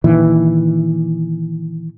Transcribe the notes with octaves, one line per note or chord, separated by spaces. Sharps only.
A#2 D#3 E3